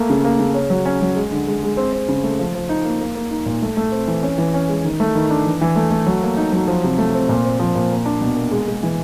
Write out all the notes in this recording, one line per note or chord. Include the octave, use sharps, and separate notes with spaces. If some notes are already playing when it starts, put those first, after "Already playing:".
Already playing: A3 A#3
C#3
A#3
C#3
C#4
F#3
C#4
F#3
G#3
D3
G#3
G#3
C4
C4
C#3
A3
F3
F3
D#4
A#3
A#3
A#3
D#4
A#2
A3
A3
C4
E3
C#4
E3
C#4
G#3
D#3
A3
D#3
D4
E3
E3
A3
A3
F#3
A#3
D#4
F#3
F3
C3
A3
C4
A#2
C4
F3
A#2
A#3
D4
B2
A#3
G#3
G#3
E3